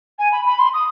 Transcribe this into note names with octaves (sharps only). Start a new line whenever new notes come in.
G#5
B5
B5
C6
D#6